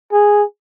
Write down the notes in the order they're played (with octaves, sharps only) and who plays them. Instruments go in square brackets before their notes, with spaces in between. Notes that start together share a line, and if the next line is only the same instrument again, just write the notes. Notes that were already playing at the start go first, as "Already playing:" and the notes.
[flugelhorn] G#4